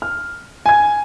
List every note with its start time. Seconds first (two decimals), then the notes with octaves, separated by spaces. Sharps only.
0.02 F6
0.66 G#5 G#6